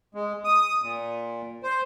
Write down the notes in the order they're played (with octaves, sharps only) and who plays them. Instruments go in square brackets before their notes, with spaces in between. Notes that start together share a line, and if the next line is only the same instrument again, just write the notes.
[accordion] G#3
D#6
A#2
C5